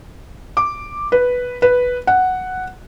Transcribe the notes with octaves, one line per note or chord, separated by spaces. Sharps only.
D6
B4
B4
F#5